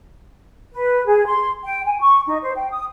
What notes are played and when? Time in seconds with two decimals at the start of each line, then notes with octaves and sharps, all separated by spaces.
0.73 B4
1.06 G#4
1.26 C6
1.65 G5
1.87 G#5
2.01 C#6
2.28 D#4
2.42 C5
2.56 G5
2.70 D#6